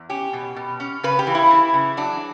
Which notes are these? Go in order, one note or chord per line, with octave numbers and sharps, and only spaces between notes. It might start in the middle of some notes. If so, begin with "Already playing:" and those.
Already playing: E2
C#4 G4
B2
B2
C#4
C#3 B4
G4
E3
E4
E3
C#3
F#3 D4